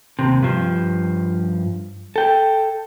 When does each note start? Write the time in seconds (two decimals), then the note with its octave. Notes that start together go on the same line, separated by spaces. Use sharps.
0.19 D#2 C3
0.43 G2 F3
2.16 A4 G5